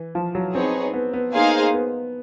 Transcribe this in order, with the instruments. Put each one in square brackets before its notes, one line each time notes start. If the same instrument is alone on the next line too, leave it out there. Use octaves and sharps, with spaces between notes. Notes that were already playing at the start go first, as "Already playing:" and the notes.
Already playing: [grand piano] E3
F3
F#3
[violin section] B3 D#4 G#4 C#5 [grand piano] C4
[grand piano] B3
B3
[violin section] A#3 D#4 G#4 C5 F5
[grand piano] B3